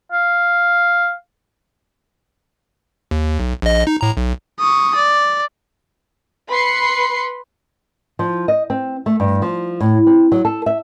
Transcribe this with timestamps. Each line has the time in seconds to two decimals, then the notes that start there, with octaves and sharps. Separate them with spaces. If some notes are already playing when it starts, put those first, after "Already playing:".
0.12 F5
3.11 D#2
3.39 B1
3.62 A#1 D#5
3.87 D#4
4.01 A2 A#5
4.17 B1
4.60 C#6 D#6
4.96 D5
6.50 B4 B5 C6 C7 C#7
8.19 F3
8.48 D#5
8.70 C4
9.06 A3
9.20 G2
9.42 F3
9.80 A2
10.07 C4
10.32 F#3
10.45 A4
10.66 E5